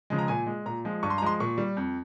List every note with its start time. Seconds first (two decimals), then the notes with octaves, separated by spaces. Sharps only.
0.10 C#3 F3 G#3
0.18 A#5
0.28 A#2 G#5
0.47 G#3
0.66 A#2 A#5
0.85 F3 G#3
1.03 G2 C#6
1.10 C6
1.18 A#5
1.22 F3 G#3 C6
1.40 A#2 C#6
1.58 G3
1.77 F2